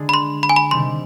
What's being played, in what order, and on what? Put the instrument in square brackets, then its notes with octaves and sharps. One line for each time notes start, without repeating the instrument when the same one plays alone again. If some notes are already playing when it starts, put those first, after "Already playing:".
Already playing: [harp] D3 G#3 D4 G#4
[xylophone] B5
C6
B5
G#5
B5
[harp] C3 D#3 G3 [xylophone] C6